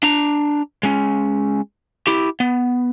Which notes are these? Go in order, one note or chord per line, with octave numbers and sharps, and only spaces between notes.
D4 A#5
G#3 C#4
E4 G4
B3